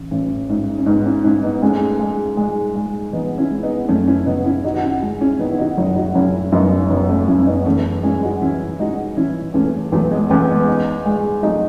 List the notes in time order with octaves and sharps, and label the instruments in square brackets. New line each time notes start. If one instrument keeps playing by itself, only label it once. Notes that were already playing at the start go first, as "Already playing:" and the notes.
Already playing: [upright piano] A1
A1
G#2
[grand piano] C#4
[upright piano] G#2 [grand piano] B3 D#4
[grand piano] C#4 E4
[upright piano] G#2 [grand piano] C#4 E4
[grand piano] B3 D#4
[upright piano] G#3 [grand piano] A3 C#4
[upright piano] G#3
G#3
G#3
[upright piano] E3 [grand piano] B3 D#4
[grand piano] C#4 E4
[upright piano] G#3
[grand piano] B3 D#4
[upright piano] F#2 [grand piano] A3 C#4
[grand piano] C#4 E4
[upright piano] C#3 [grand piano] B3 D#4
[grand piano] C#4 E4
[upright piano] D#3 [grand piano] D#4 F#4
[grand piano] F#4
C#4 E4
[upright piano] G#3
[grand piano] C#4 E4
[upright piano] D#3 [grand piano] B3 D#4
[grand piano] E4
D#4 F#4
[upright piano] F#1 [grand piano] D#4 F#4
[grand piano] D#4 F#4
[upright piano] F#1 [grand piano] C#4 E4
[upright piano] F#2 [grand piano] B3 D#4
[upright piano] F#1 [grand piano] B3 D#4
[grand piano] A3 C#4
[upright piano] F#2 [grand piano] C#4 E4
[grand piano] C#4
B3 D#4
[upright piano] E2 [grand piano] A3 C#4
[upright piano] G#3 [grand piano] C#4 E4
[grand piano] D#4 F#4
[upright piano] E3 [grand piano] C#4 E4
[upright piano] G#3 [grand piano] D#4 F#4
[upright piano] E3 [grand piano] C#4 E4
[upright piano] E2 [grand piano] A3 C#4
[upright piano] E2 [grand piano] F#3 A3
[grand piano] G#3 B3
[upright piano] E2 [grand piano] A3 C#4
[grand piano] G#3 B3
[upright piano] D#4
G#3
[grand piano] F#3 A3 [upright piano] D#4